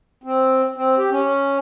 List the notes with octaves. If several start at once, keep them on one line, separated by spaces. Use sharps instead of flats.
C4
C4
G4
C#4